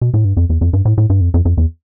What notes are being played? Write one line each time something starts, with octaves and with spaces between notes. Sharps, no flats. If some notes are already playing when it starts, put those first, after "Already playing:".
B2
A2
G2
F2
E2
F2
G2
A2
A2
G2
F2
F2
F2
E2